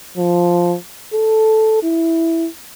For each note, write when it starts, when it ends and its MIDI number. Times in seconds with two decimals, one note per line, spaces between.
0.17 0.76 53
1.14 1.83 69
1.83 2.47 64